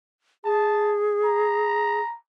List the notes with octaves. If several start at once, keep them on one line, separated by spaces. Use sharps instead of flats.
G#4 A5
A#5